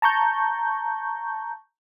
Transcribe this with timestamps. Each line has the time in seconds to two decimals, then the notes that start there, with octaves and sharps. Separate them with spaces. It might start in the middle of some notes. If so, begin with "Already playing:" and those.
0.02 A5 A#5 C#6 G6